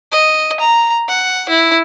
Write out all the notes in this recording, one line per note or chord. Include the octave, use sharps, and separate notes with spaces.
D#5
A#5
F#5
E4